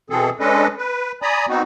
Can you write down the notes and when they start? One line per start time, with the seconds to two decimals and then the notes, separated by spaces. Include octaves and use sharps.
0.10 B2 E3 C4 G#4 A4
0.40 G#3 C#4 D4 A4 B4 D#5
0.78 B4
1.22 D5 G#5 A#5 B5 D#6
1.49 B3 C4 D#4 F#4